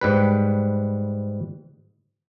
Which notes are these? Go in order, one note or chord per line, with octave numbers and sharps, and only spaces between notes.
G#2 G3 B4